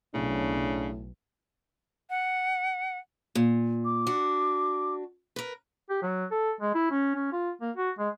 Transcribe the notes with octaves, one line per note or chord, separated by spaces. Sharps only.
B1 A2 C#3 D4
F#5
A#2
D6
D4 F#4
A#4 B4
G4
F#3
A4
G#3
E4
C#4
C#4
F4
A#3
F#4
G#3